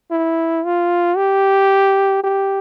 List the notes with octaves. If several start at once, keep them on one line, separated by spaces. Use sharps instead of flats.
E4
F4
G4
G4